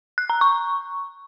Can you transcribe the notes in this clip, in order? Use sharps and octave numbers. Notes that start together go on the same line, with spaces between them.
F#6
A#5
C#6